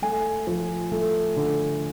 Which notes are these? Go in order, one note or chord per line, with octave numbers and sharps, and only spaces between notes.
A3 G#5
F3
A3
D3